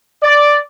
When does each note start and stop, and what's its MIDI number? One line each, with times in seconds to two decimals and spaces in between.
0.23 0.55 74